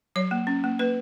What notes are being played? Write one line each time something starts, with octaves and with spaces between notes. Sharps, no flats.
F#3 C#5
A#3
C#4
A#3
A#3 B4